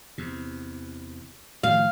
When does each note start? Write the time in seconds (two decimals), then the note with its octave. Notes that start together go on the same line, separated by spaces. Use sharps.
0.18 E2 C3
1.63 A2 D#3 F3 F5